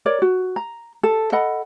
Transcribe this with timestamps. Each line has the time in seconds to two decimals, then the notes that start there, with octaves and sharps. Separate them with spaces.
0.06 A#4 C#5 D5
0.22 F#4
0.56 A#5
1.03 A4
1.32 A4 D#5 F#5 B5